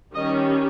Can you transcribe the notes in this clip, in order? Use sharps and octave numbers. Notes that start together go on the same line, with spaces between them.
D#3 G3 C#4 D#5